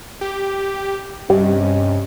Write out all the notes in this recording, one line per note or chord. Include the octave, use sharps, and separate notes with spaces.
G4
G2 C3 G3 C#4 D#5